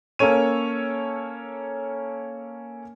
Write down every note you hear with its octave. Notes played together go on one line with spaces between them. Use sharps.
A#3 C#4 A4 C#5 D#7